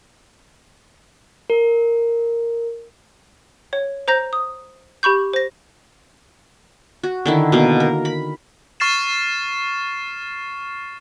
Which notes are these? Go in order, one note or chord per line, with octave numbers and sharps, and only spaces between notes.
A#4
C#5
C5 A#5 G6 A#6
D#6
G4 B5 C#6 G6
C5 A#6
F#4
D3 D#3 E4
B2 A#3
A#4
B5
C#6 F6 A6 C7 E7